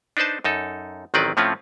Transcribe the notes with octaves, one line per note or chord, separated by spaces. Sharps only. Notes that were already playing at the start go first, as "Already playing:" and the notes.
D4 D#4 B4 C5 A5
F#2 D#4 A4
A1 D#3 F#3 C4 B4 D5
A2 F3 A3 C4 C#4 F4